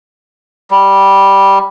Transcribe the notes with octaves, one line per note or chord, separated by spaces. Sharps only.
G3